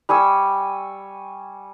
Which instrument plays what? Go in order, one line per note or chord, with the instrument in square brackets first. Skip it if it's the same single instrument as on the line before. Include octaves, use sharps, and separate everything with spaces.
[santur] G3 G#5 C#6 E6